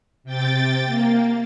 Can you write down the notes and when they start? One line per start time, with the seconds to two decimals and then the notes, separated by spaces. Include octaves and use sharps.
0.24 C3 G5 A6
0.84 A#3